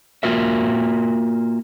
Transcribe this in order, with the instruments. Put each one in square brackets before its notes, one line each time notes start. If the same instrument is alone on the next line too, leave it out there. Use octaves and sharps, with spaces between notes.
[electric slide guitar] A#3 F4 F#4 A#4 E5